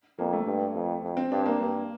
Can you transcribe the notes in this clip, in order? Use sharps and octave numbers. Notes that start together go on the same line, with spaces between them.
F2 A#3
A3
G2
F2
F2
C4
G2 D4
A#3
G2